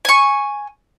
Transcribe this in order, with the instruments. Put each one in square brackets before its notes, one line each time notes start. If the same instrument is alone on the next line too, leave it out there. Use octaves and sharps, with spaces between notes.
[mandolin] G#5 C#6